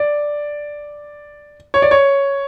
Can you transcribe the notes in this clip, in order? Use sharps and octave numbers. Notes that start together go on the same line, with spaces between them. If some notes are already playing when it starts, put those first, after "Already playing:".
Already playing: D5
C#5
D5
C#5